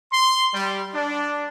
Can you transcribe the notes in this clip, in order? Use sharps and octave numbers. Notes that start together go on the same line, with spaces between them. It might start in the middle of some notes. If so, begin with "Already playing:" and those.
C6
G3
D4